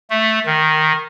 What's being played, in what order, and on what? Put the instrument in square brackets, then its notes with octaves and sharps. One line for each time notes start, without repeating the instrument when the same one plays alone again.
[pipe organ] A3
D#3